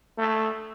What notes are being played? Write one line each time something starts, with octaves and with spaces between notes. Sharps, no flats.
A3